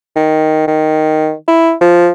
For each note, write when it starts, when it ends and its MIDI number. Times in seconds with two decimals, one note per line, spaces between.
0.16 0.63 51
0.68 1.33 51
1.48 1.72 64
1.81 2.11 53